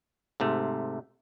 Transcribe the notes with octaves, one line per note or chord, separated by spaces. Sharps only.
G#2 C3 A3